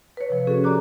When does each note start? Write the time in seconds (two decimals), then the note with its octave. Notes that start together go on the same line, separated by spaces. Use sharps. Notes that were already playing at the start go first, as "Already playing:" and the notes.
0.17 B4 C#5
0.30 C3 F3
0.47 C#4 F#4 G#4 A4 C#5
0.64 G4 D5 A#5 D6 F#6